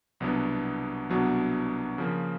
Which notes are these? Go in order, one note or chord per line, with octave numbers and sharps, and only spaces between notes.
C2 B2 F#3 B3 D4
C2 B2 F#3 B3 D4
C#3 F3 A#3